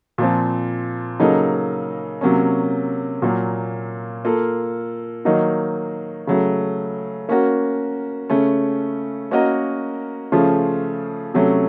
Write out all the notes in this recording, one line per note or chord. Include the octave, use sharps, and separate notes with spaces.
A#2 F3 C4
C#3 F#3 A#3 D#4 A4
C3 F#3 A#3 C#4
A#2 F#3 A#3
A#3 F4 A4
D#3 F#3 A#3 D#4
C#3 F#3 A3
A#3 C#4 F#4 A#4
C#3 A3 C#4
A#3 C#4 F#4 A#4 D#5
C#3 F3 A3 C#4 F4
C3 F#3 A3 C#4